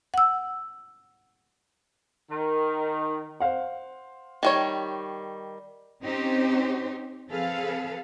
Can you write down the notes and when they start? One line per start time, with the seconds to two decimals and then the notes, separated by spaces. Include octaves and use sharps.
0.14 F#5 E6
2.31 D#3
3.40 C5 F5 F#5
4.43 D#3 G3 C#5
6.02 C4 C#4 D#4 G4 C5
7.29 F3 C4 G#4 A4 B4 F5